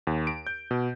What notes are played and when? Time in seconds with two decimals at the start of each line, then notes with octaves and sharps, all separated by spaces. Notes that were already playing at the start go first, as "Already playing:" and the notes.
0.07 D#2
0.27 D7
0.47 G6
0.71 B2